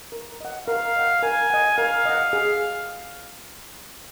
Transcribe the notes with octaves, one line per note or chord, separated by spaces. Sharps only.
A#4
D#5 F#5
A#4 F5
D#5 F#5
A#4 G#5
D#5 F#5
A#4 F5
D#5 F#5
G#4